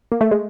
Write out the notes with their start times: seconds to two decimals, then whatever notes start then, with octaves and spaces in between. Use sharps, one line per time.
0.12 A#3
0.21 A3
0.31 G#3